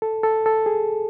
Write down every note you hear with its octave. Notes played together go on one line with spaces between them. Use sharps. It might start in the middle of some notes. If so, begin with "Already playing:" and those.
A4
A4
A4
G#4